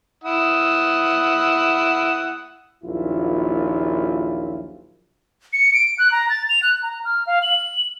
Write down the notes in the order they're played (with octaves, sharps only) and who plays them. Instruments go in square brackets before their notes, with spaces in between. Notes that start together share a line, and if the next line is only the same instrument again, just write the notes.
[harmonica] E4 F#5 D#6
[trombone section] A#1 D#2 F#3 E4 F4
[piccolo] C#7
D7
F#6
A#5
A6
F7
F#6
A#5
F6
F5
F#7